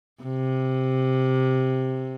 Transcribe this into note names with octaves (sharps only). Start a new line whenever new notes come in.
C3